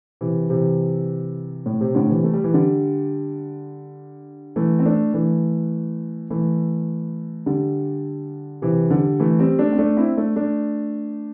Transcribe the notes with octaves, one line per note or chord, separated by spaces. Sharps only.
C3 E3
C3 E3
A2
C3
A2 D3
C3 E3
A3
G3
E3
D3 G3
E3 A3
C4
A3 D4
E3 A3
E3 A3
D3 G3
C3 E3
D3 G3
E3 A3
G3 C4
A3 D4
C4
A3 D4
C4 E4
A3 D4
A3 D4